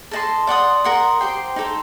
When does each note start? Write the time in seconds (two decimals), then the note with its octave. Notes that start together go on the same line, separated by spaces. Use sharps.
0.11 A4 D#5 A5 C6
0.47 D5 F#5 C6 D#6
0.84 A#4 F#5 C6 D#6
1.20 G4 C5 G5 C6
1.56 D#4 A4 C5